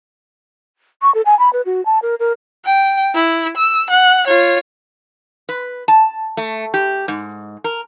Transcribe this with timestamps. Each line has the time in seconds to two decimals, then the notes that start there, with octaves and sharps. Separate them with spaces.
1.02 C#6
1.15 A4
1.26 G#5
1.39 B5
1.53 B4
1.66 F#4
1.86 A5
2.02 A#4
2.20 A#4
2.65 G5
3.14 E4
3.57 E6
3.90 F#5
4.27 F4 C#5
5.49 B4
5.88 A5
6.37 A3
6.74 G4
7.08 G#2
7.64 A#4